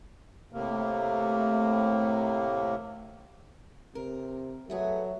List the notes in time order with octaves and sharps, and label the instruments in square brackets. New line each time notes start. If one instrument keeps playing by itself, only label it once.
[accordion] A2 C3 A#3
[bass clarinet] A3
[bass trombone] C3 [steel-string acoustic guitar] A#4
[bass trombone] F#3 [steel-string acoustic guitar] A3 B3 G#4